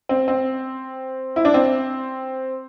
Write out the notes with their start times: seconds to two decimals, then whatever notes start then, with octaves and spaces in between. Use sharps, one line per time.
0.09 C4
0.28 C4
1.36 E4
1.45 D4
1.54 C4